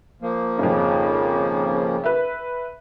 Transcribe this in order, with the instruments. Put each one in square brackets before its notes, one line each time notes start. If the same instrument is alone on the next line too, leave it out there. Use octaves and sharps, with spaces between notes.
[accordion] F3 A#3
[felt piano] G#1 F2 [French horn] C#3
[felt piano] B4 E5